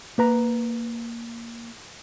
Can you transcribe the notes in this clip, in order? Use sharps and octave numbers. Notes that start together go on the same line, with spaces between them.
A#3 B4 A#5